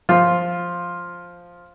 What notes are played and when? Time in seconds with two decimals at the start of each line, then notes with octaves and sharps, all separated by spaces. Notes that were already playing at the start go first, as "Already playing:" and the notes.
0.09 F3 F4